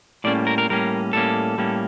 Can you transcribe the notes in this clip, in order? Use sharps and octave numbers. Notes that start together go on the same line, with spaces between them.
A2 G3 A#3 C#4 D5
A#4
A#4
A2 G3 A#3 C#4 A#4
A2 G3 A#3 C#4 A4
A2 G3 A#3 C#4